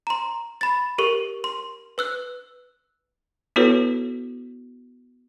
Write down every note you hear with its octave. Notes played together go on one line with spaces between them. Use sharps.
A#5 C6
B5 A6
G4 A#4 C#6
C6
B4 E6 F#6
B3 E4 F#4 A4 B4 C#5